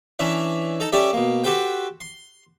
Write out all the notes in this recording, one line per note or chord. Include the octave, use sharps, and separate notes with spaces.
E3 C#4 D4 E5
D#4 A4 A#5
G3 C#4 G4 A4 D5 E5
B2 A#3
F#4 G4 A4 B4 C5 G5
C6